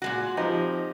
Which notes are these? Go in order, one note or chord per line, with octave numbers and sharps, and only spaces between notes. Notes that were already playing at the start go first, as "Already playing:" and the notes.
A#2 G#3 F#4
F3 C4 D#4 G4